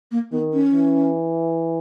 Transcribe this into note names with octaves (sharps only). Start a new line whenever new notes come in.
A#3
D#3 B3
C#4
E3